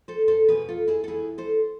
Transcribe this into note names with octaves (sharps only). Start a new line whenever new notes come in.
A4 C5
A4 C5
E2 B2 B3 G#4 B4
F4 A4
E4 G#4
A4
E2 B2 B3 E4 G#4
A4 C5